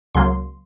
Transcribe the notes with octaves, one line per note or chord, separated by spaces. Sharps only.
C#2 C#3 F#3 A#3 C6